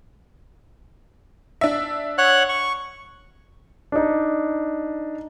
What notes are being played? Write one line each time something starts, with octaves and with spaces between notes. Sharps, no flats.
D4 E5
C#5 F#5 F#6
C#6
D4 D#4